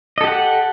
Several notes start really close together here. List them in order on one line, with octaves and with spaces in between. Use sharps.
D#5 A4 G4 F#5